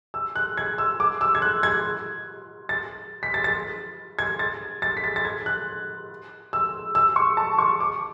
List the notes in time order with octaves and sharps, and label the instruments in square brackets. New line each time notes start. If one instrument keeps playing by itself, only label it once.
[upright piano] E6
F#6
G#6
E6
D6
E6
G#6
F#6
G#6
A6
B6
A6
A6
G#6
A6
A6
B6
A6
A6
G#6
F#6
E6
E6
C#6
A5
C#6
D6